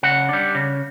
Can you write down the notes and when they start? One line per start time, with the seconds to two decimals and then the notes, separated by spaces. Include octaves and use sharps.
0.03 C#3 F#5
0.29 G3 D4
0.55 C#3